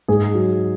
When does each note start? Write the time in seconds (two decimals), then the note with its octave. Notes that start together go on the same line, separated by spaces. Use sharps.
0.08 G#2 G#4
0.34 F#3